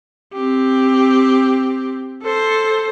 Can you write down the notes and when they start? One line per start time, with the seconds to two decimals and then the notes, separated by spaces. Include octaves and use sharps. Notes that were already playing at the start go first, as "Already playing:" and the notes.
0.34 C4 G4
2.23 A4 C5